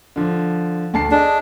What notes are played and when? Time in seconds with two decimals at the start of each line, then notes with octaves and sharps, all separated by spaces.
0.16 D3 F3
0.94 D2 A5 C7
1.11 D4 G#4 D#5